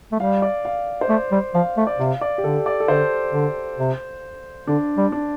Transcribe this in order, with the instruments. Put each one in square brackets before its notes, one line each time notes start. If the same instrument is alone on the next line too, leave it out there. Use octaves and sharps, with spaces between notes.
[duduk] A3
[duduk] G3 [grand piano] F5
[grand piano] D5
F5
C5
[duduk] A3 [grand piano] D5
[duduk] G3
[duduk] F3 [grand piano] F5
[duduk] A3
[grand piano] D5
[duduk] C3 [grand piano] F5
[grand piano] D5
G4
[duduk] D3 [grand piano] A4
[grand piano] D5
A4
[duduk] D3 [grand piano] C5
[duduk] D3
C3
[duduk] D3 [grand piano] D4
[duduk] G3
[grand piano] D4